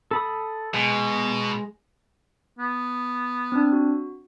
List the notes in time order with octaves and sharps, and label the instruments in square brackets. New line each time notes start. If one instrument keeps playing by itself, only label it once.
[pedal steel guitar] A4 B5 D#6
[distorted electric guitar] B2 [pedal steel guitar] G#3
[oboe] B3
[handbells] C4 D4
F#4